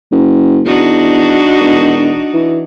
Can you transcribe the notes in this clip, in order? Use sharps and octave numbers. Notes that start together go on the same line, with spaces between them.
F#1
E2 D4 D#4 F#4
E1
E3